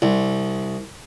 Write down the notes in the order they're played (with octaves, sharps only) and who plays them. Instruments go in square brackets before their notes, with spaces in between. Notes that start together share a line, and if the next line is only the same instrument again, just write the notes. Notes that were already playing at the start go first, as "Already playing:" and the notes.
[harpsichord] C2